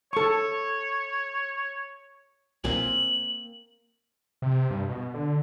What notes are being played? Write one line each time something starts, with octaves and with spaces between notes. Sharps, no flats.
A4 C#5 C#6
B1 A#2 A#3 C4 G#5 F#7
C3
G2
B2
D3